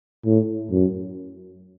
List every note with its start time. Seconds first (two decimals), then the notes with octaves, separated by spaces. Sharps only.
0.25 A2
0.71 F#2